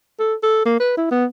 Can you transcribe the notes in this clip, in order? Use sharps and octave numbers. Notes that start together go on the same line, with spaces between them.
A4
A4
A#3
B4
E4
B3